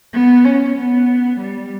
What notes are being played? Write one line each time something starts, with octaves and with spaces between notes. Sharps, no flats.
B3
C#4
B3
G3